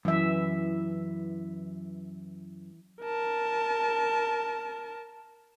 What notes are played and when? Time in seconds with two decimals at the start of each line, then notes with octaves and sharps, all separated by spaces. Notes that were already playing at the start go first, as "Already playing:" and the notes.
0.05 F#2 E3 E5
3.01 A#4 A5